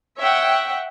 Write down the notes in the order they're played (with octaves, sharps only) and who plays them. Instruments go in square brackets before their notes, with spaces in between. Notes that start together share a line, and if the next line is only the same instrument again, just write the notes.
[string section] C#5 E5 F#5 G5